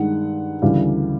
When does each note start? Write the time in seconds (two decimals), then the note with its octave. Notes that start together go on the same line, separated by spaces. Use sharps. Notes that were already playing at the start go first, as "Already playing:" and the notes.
Already playing: G2 D#3 G#3 F#5
0.62 D2 C#3 E3 G3 F5